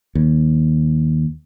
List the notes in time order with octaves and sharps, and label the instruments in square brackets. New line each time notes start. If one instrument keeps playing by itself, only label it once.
[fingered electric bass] D#2